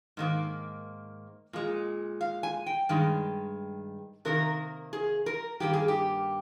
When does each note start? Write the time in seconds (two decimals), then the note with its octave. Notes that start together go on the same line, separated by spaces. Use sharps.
0.17 G#2 D#3 A#3
1.53 A#2 G#3
2.21 F5
2.43 G#5
2.66 G5
2.89 G2 D#3 G#3
4.25 C3 D#3 A#3 A#4
4.93 G#4
5.26 A#4
5.60 G2 D#3 A#3 G4
5.73 G#4
5.88 G4